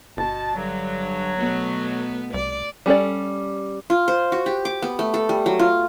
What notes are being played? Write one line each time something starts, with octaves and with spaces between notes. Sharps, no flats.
G1 B2 A5
G2 D3 F#3
B2 A3 B3
C2 D5
G3 C#4 A4 D5
F4
C5
F#4
G4
D6
B3
A3
A4
G3
F#3
F4